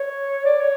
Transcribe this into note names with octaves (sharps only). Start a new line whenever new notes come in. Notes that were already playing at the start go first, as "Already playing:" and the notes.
Already playing: C#5
D5
C#5